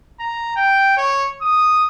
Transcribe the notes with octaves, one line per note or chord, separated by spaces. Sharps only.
A#5
G5
C#5
D#6